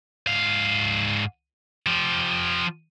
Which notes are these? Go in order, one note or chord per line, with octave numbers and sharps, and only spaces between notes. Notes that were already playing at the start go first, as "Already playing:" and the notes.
G#2 F5
F3 G4